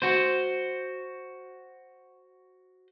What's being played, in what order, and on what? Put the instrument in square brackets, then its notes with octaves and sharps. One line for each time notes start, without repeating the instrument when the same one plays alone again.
[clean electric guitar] F#4 C5